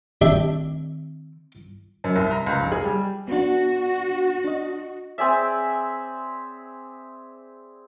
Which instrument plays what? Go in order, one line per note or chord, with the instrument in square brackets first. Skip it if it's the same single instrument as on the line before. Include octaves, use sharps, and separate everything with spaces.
[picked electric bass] D#3 A3 C4 [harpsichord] D4 G4 E5
[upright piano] F#2
C2
A#5
C#2
F1
G#4
G3
[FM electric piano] B3 D4 [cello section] F#4
[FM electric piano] D4 D#5
[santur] C4 G#4 D5 E5